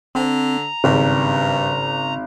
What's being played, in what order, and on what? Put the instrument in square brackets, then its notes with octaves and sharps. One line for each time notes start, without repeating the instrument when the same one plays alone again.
[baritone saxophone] D3 [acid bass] C4 [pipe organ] A#5
[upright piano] G#1 [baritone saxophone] G2 [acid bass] C#3